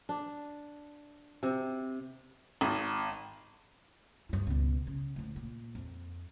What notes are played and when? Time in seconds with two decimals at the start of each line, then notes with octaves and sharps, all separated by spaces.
0.09 D4
1.43 C3
2.61 G#1
4.29 G2 E4
4.47 C#2 B2
4.87 C#3
5.16 D2 A2
5.36 A#2
5.75 F2